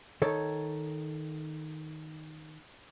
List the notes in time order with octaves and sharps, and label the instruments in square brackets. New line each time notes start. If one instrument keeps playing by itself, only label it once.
[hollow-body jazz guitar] D#3 A4 C#5